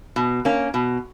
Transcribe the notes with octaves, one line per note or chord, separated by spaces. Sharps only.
B2
A#3 C#4
B2